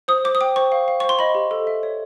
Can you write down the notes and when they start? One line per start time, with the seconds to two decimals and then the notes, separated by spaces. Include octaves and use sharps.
0.08 C5 D#6
0.25 C5 D6
0.35 D#6
0.41 G5 D6
0.56 C5 C#6
0.72 F5
0.88 F5
1.00 C5 C#6
1.09 C6
1.19 D#5 B5
1.35 G4
1.51 A4
1.67 E5
1.83 C#5